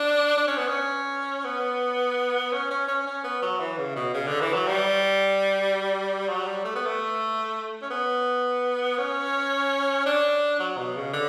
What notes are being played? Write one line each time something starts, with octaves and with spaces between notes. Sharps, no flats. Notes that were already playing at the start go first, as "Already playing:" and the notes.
Already playing: D4
D4
C#4
B3
C#4
B3
C#4
C#4
C#4
C#4
B3
F#3
E3
C#3
B2
C#3
D3
E3
F#3
G3
F#3
G3
A3
B3
A3
C#4
B3
C#4
D4
F#3
B2
C#3
D3